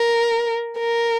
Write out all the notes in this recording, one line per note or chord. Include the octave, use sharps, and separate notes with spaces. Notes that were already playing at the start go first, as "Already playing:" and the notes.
Already playing: A#4
A#4